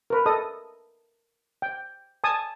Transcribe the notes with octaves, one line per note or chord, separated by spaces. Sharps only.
A#4 B4
A4 D#5 D#6
G5
G#5 A5 D#6